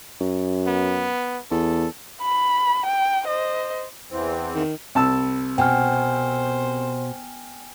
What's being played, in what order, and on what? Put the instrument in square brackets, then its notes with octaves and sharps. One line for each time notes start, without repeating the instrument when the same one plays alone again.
[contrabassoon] F#2
[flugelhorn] B3
[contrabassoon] E2 [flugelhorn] A4
[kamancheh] B5
G5
C5 D#5
[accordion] E2 E3 C4
[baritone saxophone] D#3
[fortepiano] C2 A5 E6
[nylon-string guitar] B2 [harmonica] C5 [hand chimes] G5 G#5 F6